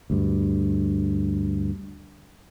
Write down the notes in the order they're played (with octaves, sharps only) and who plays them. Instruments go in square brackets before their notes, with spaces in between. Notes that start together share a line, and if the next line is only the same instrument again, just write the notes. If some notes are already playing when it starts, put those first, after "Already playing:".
[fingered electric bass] D2 G2